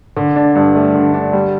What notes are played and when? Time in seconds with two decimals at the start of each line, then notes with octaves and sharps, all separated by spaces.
0.17 D3
0.36 D4
0.55 G2
0.75 A3
0.95 D3
1.14 D4
1.33 G3